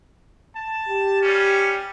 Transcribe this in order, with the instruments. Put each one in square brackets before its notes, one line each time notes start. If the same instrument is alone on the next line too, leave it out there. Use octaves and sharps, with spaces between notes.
[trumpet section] A5
[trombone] G4
[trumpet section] G3 C#4